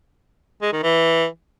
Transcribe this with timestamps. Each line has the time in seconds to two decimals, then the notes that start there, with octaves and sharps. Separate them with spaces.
0.62 G#3
0.72 D#3
0.83 E3